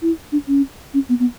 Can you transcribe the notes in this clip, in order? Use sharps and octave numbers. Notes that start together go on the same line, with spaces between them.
E4
D4
C#4
C#4
B3
B3